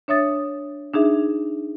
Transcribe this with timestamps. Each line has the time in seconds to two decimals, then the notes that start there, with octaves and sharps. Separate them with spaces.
0.08 D4 C#5 E5 D#6 A6
0.93 D4 D#4 G#4 E5